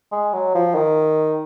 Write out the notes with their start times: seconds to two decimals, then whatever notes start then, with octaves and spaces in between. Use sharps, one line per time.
0.12 G#3
0.33 F#3
0.55 F3
0.75 D#3